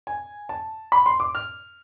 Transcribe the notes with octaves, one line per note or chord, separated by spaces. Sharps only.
G#5
A5
B5
C6
D6
F6